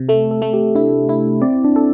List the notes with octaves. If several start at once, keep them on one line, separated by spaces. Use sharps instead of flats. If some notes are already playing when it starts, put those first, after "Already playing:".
Already playing: C3
A3 A4
A4
A3
G4
D4 E4
E4
C4 D5
D4
A4